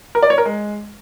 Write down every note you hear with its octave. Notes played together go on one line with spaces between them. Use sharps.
A#4
D5
C#5
A#4
G#3